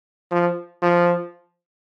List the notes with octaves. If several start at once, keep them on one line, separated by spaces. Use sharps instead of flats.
F3
F3